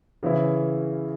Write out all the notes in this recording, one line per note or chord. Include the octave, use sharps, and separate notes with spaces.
C#3 E3 C#4 E4